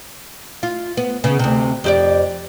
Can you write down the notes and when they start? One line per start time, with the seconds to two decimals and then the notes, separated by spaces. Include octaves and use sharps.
0.63 F4
0.97 B3
1.24 C#3 B3
1.39 D2 C3
1.84 F2 G4 D5